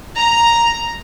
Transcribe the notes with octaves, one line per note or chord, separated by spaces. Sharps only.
A#5